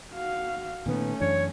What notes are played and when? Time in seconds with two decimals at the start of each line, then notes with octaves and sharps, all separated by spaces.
0.13 F#4 F5
0.86 A#2 D#3 A3 B3 C#4
1.21 F#2 E3 D4 C#5